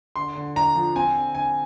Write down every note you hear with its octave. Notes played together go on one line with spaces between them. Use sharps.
D3 C6
D3
D4 A#5
F3
C4 G#5
D3
D3 G#5